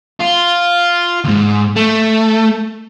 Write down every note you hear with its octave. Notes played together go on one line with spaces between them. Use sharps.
F4
D#2 G#2
A3